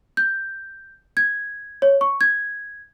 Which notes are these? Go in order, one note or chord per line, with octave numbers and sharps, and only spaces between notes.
G6
G#6
C#5
C#6
G#6